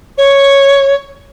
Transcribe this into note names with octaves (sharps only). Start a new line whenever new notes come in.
C#5